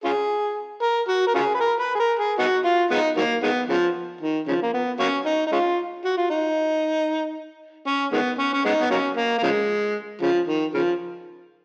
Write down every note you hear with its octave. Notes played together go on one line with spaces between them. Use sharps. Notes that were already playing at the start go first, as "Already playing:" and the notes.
C#4 F4 G#4
A#4
F#4
A#4
C#4 F4 G#4
B4
A#4
B4
G#4
A#4
G#4
B3 D#4 F#4
F4
G#3 B3 D#4
D#3 F#3 A#3
D#3 G#3 B3
C#3 F3
D#3
C#3 F3
A#3
B3
F#3 A#3 C#4
D#4
D#4
G#3 C#4 F4
F#4
F4
D#4
C#4
D#3 G#3 B3
C#4
C#4
G#3 B3 D#4
B3
F#3 A#3 C#4
A#3
A#3
C#3 F3 G#3
C#3 F3
D#3
C#3 F3